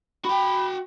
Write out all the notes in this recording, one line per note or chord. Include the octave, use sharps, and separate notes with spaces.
F#4 G5 B5